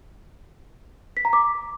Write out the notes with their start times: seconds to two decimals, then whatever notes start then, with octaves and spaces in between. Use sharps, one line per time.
1.17 B6
1.25 A#5
1.33 D6